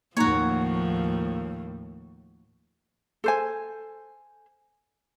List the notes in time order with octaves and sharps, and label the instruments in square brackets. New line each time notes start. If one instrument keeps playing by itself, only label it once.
[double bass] D#2 A2 [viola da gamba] F3 [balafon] A#3 D#4 A#5 [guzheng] F#4 C#5
[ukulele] A4 C5 G#5